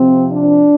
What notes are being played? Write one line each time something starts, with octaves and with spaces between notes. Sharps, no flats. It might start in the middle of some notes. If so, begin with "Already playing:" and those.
Already playing: C3 F3 C4
D4